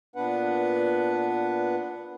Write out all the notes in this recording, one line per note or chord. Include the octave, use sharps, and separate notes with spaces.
A#2 B3 D4 B4 F#5